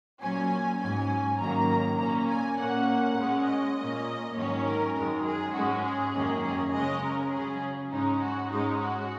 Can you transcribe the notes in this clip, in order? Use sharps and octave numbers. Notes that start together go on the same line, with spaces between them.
A#2 F#3 C#4 G#5
G#2 F#3 C#4 G#5
G#2 D#3 F#3 A#3 C#4 A#5
A#2 A#3 C#4 A#5
G#5
A#2 A#3 C#4 F#5
A#2 G#3 C#4
D#5
A#2 A#3 C#4
G#2 D#3 F#3 C#4 C#5
A#4
F#2 D#3 G#3 A#4
G#4
G#2 G#3 C#4 F#4
G#4
F#2 D#3 A#3 C#4
G#4
C#3 G#3 C#4 D#5
A#4
C#3 F#3 C#4 G#4
G#2 G#3 C#4 D#4
F#4
G#2 G#3 C#4 D#4
F#4